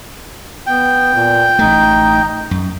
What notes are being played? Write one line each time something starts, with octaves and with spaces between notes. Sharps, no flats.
B3 G5
A#2
A1 A3 D#4
F#2